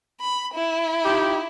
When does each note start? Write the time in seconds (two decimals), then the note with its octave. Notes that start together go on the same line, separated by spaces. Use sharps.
0.21 B5
0.54 E4
1.04 D#4 F4 G4